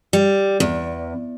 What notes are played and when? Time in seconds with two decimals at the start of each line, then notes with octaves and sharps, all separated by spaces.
0.13 G3
0.60 E2